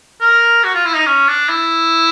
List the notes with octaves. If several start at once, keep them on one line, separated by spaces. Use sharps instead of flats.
A#4
F#4
F4
E4
D#4
C#4
D4
E4